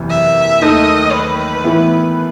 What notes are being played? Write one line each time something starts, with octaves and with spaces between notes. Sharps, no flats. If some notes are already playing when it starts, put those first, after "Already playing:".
Already playing: F#1 E2 C3 E3
E5
D#2 D#3 A3 D#4 A4 D#5
B4
A2 E3 B3 E4